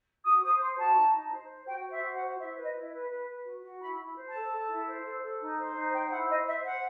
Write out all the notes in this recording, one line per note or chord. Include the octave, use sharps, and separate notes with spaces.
F#4 D#6
C5 D#6
C5 C6
F#4 A5
D#4
D#4
C5
C5
F#4 G5
C5
E5
F#4
F#5
C5
E4 E5
B4
D#5
E4
B4
B4
B4
F#4
F#4
E4 B5
E4
C5
A5
A4
A4
E4
C5
A4
A4
D#4
C5
D#4
C5 G5
E4 F#5
C5 D#5
C5 E5
C5 F#5